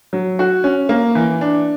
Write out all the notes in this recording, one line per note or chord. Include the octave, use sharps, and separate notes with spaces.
F#3
F#4
C#4
A#3
E3
D4